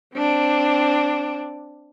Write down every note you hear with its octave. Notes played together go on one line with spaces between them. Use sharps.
C4 D4